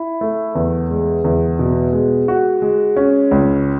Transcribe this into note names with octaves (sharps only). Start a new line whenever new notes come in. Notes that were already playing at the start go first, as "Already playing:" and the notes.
Already playing: E4
A3
E2
G#3
E2
B2
G#3
F#4
G#3
C#4
C#2